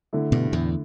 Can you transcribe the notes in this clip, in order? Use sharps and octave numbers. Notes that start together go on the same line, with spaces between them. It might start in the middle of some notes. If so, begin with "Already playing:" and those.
D3 A3 E4 A4
G2 B2
E2 A2